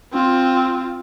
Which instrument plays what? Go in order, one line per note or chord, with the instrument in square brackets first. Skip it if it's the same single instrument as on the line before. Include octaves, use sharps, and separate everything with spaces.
[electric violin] C4 F4